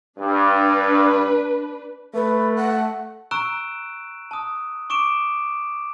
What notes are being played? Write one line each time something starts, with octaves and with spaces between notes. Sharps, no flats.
G2 D4 B4
A3 B4
F#5
A#5 C#6 E6 F#6 D7 E7
A5 D#6
C#6 D6 D7 E7